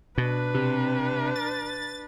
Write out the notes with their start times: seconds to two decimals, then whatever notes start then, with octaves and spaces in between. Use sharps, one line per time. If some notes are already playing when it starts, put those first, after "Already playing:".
0.18 B2 D4 B4
0.54 C3
1.36 A6